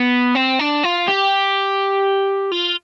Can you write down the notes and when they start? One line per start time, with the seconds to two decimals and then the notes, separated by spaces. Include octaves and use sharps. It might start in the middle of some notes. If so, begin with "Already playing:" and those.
Already playing: B3
0.35 C4
0.59 D4
0.83 F4
1.08 G4
2.52 F4